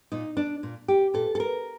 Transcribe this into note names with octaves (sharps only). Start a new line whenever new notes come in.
A#2 D#4
D4
A#2
G4
A#2 A4
A4
A#4